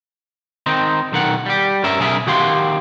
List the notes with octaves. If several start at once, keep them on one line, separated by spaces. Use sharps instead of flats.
D#3 C4 D#4
B1 D#3 F#5
G3 G4
G2 C#4 A#4 E5
B1 C#3 G#4 A#4 E5
D#3 F#4 G4 F5 C6